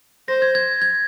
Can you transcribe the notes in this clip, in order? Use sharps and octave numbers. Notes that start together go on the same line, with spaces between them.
C5 A#6
G#6
G#6
G#6